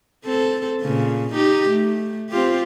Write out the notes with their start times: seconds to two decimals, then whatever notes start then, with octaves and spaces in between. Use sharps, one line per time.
0.25 C4 A4
0.81 A#2 C#3
1.33 D#4 G4
1.69 A3
2.30 C4 F4 G4